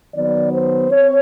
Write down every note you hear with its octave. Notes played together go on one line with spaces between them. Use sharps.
D#3 F#3 B3 D5
C5
C4 C#5